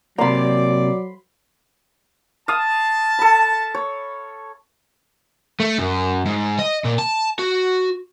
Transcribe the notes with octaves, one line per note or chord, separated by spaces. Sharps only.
C3 F#3 A#3 D5 B5 C6
F5 A5 D#6
A4 B5
C#5
A3
F#2
G#2
D#5
A#2
A5
F#4